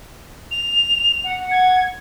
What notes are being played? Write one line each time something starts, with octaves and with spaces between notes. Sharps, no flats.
F7
F#5
G#6